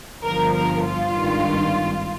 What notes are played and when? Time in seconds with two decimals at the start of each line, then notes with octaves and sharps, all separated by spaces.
0.25 G1 G2 F3 A#4
0.55 A#4
0.85 F4
1.14 G#1 G2 D#3